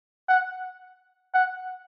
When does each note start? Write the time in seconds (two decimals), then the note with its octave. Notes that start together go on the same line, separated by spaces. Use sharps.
0.29 F#5
1.34 F#5